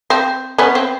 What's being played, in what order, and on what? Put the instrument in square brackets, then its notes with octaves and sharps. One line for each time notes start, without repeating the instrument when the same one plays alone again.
[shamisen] C4
B3 C#4
C4